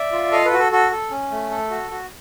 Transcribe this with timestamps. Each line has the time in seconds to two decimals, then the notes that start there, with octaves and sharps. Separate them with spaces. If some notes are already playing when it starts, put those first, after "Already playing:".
Already playing: D5 E5
0.12 F4
0.32 A4 D#5 F5
0.45 A4 B4
0.53 F#4
0.59 A4
0.72 F#4 A4
0.91 A4
1.11 C#4
1.31 A3
1.51 A4
1.71 F#4
1.91 F#4